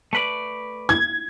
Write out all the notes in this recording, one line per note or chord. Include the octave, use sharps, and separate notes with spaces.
A3 B4 D5
G#6